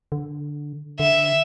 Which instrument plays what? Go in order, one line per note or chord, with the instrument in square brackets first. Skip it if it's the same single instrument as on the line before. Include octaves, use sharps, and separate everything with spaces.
[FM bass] D3
[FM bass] D3 [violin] E5